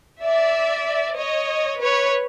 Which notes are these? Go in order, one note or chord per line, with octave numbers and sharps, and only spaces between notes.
D5 E5
C#5 D#5
B4 C#5